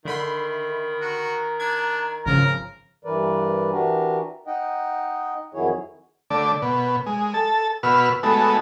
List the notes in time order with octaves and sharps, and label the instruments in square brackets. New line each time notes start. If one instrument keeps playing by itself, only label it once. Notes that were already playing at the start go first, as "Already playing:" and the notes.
[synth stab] D3 B5 C6 [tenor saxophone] D#3 [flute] E5
[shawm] F#4 [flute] A#5
[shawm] D4 [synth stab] G#6
[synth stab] G#1 C#3 F3 [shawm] A#4
[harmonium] G2 E3 A#4 B4 D5
E3 D4 F#4 G4 A#4
D#4 D#5 F#5 G5
F2 D#3 F#3 E4 G#4 C#5
[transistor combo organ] D3 A3 D5
B2
G#3
A4 A5
B2 F#4 B4 E6 F6
G#3 A3 B3 D#4 F#4 A4